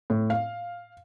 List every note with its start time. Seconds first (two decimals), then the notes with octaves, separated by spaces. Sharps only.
0.10 A2
0.30 F5